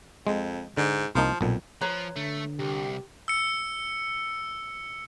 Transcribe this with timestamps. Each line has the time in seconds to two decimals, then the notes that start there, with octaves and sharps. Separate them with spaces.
0.27 F2 G#3
0.77 G#2 D3
1.15 C2 F3 A#3 D#4
1.41 B1 F2 A#2
1.81 F3 B4 C#5 A#5
2.16 D3 A3
2.59 C2 G4
3.28 E6 C#7